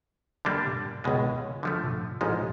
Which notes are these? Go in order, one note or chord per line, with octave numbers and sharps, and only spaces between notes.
D3 G3 A#3 D4
C#2 B2 G#3
D3 F3 A3
A1 G#2 F3 G#3